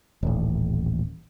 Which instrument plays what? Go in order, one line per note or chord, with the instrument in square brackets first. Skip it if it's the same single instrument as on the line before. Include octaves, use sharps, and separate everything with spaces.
[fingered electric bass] D#1 A1